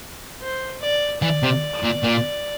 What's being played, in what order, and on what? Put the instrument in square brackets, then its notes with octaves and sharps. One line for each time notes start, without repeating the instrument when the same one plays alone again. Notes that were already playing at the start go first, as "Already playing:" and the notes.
[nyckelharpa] C5
D5
[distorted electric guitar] E3 [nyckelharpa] D5
[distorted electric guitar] C3
A#2
A#2